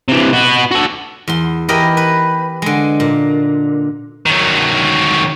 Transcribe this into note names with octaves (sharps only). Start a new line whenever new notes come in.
C3 E3
B3 F#4
F#4 A4
E2 C6
E3 G4 A#4 D#5 B5
B4
D3 G#3
A#2
D#3 F#3